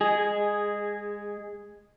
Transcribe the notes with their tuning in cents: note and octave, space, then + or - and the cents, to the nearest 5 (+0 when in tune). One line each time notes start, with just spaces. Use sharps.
G#3 -20 G#4 +0